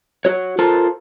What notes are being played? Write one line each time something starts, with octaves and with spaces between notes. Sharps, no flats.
F#4 C#5
F4 A4 A#4 C5 A5